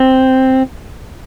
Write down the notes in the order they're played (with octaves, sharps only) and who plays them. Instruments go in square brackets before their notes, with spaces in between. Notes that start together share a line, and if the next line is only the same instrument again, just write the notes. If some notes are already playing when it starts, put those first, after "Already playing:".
Already playing: [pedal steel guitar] C4